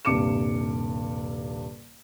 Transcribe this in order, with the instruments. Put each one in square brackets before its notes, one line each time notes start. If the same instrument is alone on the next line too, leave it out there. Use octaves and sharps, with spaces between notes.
[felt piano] D#1 G2 C3 D6 C#7 E7